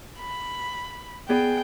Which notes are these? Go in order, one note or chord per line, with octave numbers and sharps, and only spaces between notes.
B5
B3 G#4 D5 G5